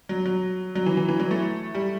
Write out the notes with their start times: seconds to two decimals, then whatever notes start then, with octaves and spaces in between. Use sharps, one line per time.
0.09 F#3
0.26 F#3
0.75 F#3
0.86 E3
0.97 E3
1.08 E3
1.20 F#3
1.31 A3
1.74 G3